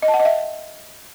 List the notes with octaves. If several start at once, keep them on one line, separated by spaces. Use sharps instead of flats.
D#5
A5
F#5
D#5
E5